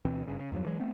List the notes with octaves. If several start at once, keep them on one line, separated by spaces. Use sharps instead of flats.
D2 B2 E3 C4
F#1 G2 C#3
C#3
E2 G2 F3 F#3
E3 F#3 G#3
A3 B3 C4